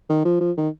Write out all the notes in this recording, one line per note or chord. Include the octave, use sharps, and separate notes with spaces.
D#3
F3
F3
D#3